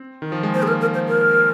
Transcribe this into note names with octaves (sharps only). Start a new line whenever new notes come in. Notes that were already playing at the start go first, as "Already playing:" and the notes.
Already playing: C4
D#3
F3
G#3
A#3 C5
G#4
A#4
A#4
C5
A#4